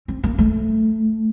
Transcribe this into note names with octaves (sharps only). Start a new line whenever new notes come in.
C4
A#3
A3